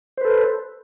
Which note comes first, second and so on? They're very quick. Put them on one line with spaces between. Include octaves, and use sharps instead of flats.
C5 B4 A4